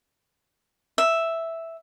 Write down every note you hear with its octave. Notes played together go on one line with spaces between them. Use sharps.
E5